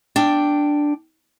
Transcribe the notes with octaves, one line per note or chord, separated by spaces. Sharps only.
D4 G5